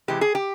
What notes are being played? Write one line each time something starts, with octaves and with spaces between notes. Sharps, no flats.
C3 E3 G#3 G4
G#4
G4